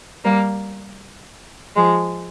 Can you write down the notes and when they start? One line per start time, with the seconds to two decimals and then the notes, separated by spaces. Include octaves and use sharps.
0.24 G3 A#3
1.75 F3 G#3